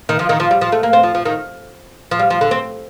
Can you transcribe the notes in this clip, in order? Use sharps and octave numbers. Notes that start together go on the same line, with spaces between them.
D#3
F3
D#3
F3
G3
F3
A3
A#3
C4
F3
F3
D#3
F3
G3
F3
D3
C4